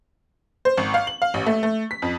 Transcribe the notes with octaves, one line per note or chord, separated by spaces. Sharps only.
C5
G#1
F5
F#7
F5
A1
A3
A3
B6
F2